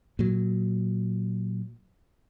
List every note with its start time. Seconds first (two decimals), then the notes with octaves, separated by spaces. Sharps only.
0.19 A#2 F#3